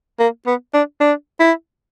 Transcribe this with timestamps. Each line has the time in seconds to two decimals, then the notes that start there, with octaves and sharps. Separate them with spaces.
0.20 A#3
0.47 B3
0.74 D4
1.00 D4
1.40 E4